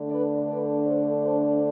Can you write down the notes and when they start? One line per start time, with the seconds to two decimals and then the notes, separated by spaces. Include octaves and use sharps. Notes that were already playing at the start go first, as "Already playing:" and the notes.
Already playing: D3 A3 D4
0.10 B4 D5
0.48 B4 D5
0.86 A4 C5
1.23 A4 C5